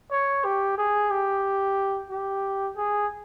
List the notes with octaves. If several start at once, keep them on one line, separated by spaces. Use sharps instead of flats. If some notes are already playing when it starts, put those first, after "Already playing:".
C#5
G4
G#4
G4
G4
G#4